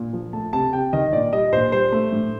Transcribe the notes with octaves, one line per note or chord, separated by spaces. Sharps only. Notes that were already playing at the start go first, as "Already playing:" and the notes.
Already playing: A#2
F3
A3 A5
C3 A5
C3 G5
D#3 D#5
A#2 D5
G3 D#5
A#2 C5
G3 C5
A3
A2